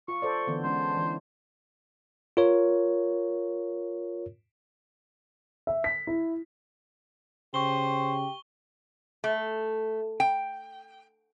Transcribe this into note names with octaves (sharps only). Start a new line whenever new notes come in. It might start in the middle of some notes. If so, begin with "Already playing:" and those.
F4 C#6
A4 C5 D5
D3 E3 B3
G#3 C#4 D4 C5
E3
F4 A#4 C#5
E5
B6
E4
C#3 G4 C5 C#6 G7
A3
G5